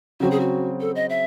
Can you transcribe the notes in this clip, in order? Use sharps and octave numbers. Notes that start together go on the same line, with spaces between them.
C#3 F#3 C4 F#4
G#4
F#4
A4
D#5
E5